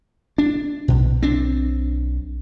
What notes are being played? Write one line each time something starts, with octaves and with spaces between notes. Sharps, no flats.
D4
B1 B2
C4 D4